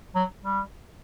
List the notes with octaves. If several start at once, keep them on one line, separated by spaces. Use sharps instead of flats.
F#3
G3